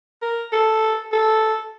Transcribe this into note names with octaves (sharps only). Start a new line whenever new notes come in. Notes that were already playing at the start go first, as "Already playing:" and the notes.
A#4
A4
A4